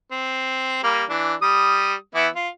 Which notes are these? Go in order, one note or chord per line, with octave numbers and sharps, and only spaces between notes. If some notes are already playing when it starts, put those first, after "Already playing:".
C4
G3 A#3
E3 D4
G3 D#6
E3 B3 E4
F4